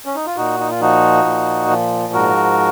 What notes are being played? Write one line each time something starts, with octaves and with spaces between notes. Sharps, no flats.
C#4
D#4
F4
A#2 D#4 F#4
D#4
F4
F3 D#4 F#4
A#2
F3
G#2 F#4 A#4